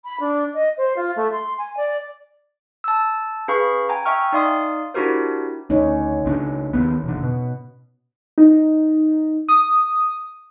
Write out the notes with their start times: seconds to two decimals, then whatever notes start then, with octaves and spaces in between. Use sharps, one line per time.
0.05 B5
0.20 D4
0.54 D#5
0.78 C5
0.96 F4
1.16 A3
1.32 C6
1.58 G#5
1.77 D5
2.84 A5 E6
3.48 C#4 G#4 B4 F5 B5 C#6
3.89 G5 G#5 A#5
4.06 E5 G5 G#5 C#6 F6
4.32 D#4 D5 F5 C6 D#6
4.94 D4 E4 F#4 G4 A#4 C5
5.70 D2 C#4 D#4 C#5
6.25 C#2 C4 D4
6.73 D#2 B3
7.04 E1 D3
7.22 B2
8.38 D#4
9.48 D#6